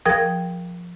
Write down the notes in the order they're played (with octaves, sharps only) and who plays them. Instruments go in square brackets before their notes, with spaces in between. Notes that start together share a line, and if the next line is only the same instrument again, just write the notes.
[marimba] F3 G#4 A#4 G5 D#6 G#6